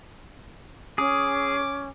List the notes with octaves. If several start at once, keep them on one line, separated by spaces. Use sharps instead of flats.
C#4 G#4 D6 D#6